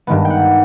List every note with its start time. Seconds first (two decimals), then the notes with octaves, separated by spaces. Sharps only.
0.07 G2 D#3 G#3 B3
0.25 G5
0.30 F#5